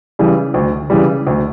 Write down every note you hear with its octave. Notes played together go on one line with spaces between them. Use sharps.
C#3 E3 G3
D2
C#3 E3 G3
D2